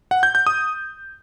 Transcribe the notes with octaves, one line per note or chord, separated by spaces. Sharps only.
F#5
G6
G6
D#6